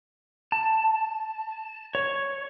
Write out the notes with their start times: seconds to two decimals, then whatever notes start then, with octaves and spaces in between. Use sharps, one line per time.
0.52 A5
1.95 C#5